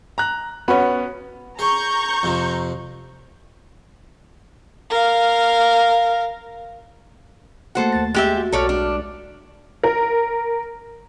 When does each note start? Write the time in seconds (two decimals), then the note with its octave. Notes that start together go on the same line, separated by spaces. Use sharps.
0.18 A#5 F#6
0.68 B3 C#4 F#4 B5
1.59 G#4 A#5 C#6 G6
2.23 F2 C3 F3
4.90 A#4 F5
7.75 A3 A#3 F#4 A4 C5 F#5
7.92 D#2 A6
8.14 G#3 G4 E5
8.36 F#4
8.52 B1 F#4 A4 C#5 D5 F6
8.69 G#3 D4
9.83 A#4